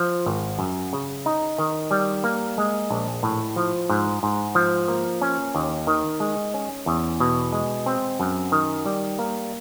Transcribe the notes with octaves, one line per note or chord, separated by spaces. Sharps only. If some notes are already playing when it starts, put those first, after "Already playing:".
Already playing: F3
G#1
F#2
C#3
D#4
D#3
G3
A#3
G#3
A#1
A2
F3
G#2
G#2
F3
A#3
C#4
D#2
D#3
G#3
C#4
E2
B2
G#3
C4
F#2
D#3
G3
A#3